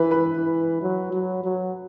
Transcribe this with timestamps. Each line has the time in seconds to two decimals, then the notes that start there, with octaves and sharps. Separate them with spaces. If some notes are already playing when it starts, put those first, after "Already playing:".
Already playing: E3 B4
0.11 B4
0.36 E3
0.83 F#3
1.13 F#3
1.44 F#3